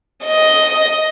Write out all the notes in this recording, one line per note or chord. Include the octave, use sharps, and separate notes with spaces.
D#5